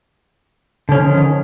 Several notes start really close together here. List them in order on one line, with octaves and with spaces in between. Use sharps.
D3 C#4 F3 D#3